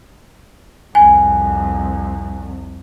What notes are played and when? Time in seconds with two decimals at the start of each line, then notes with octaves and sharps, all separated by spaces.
0.95 C2 F2 G#5